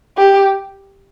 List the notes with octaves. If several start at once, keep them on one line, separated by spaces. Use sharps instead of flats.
G4